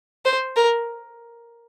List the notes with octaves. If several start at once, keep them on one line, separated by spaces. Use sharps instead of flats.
C5
A#4